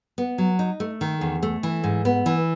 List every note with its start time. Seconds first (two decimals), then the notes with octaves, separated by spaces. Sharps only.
0.18 B3
0.38 F#3
0.59 D#4
0.80 A3
1.01 D#3
1.21 E2
1.43 A3
1.63 E3
1.84 G#2
2.05 B3
2.26 E3